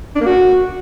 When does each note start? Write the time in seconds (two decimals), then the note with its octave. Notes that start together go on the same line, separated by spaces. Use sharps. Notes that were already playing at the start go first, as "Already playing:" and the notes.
0.16 D4
0.21 A#3
0.26 F#4